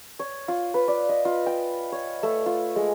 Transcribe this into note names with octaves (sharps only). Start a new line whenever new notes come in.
C#5
F4
B4
D5
D#5
F4
G5
C#5
A3
F4
G#3